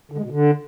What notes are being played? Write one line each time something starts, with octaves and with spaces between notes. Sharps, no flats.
D3
G#3
B2
D3